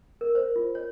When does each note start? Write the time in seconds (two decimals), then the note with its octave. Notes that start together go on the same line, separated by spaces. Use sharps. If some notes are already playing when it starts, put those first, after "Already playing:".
0.21 A#4
0.35 C5
0.56 F4
0.75 C#5